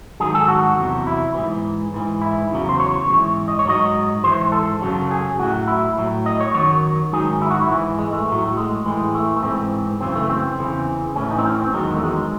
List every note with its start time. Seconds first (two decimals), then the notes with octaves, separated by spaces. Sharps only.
0.20 G#2 D#3 F#3 G#4
0.35 A4
0.48 F#4
0.77 E2 C3 F#3
1.07 E4
1.35 G#2 E3
1.93 G#2 E3
2.22 E4
2.51 E2 C#3 F#3
2.69 C5
2.80 C#5
3.08 G#2 E3
3.48 D#5
3.59 C#5
3.66 G#2 F#3 D#5
4.23 G#2 E3 C5
4.52 A4
4.82 F#2 C#3 F#3
5.11 G#4
5.39 A2 F#3 F#4
5.68 E4
5.97 A2 F#3
6.26 D#5
6.40 C#5
6.54 F#2 D#3 F#3 C#5
7.12 G#2 D#3 F#3 G#4
7.42 E4
7.51 F#4
7.62 E4
7.70 G#2 E3
7.99 G#3
8.13 A3
8.28 A2 F#3
8.47 F#3
8.57 G#3
8.86 A2 E3
9.15 A3
9.36 A3
9.43 G#2 E3 C4
10.00 F#2 C#3 E3 C4
10.16 A3
10.30 C4
10.58 E2 C#3 E3
11.16 A2 E3 C#4
11.31 D#4
11.38 C4
11.46 C#4
11.60 C4
11.74 E2 D#3 F#3 G#3
11.97 A3
12.03 G#3